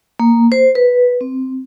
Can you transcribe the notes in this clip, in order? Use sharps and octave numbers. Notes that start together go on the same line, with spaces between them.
A#3
C5
B4
C4